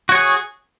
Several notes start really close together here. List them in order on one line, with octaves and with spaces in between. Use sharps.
F#4 C#5 G#4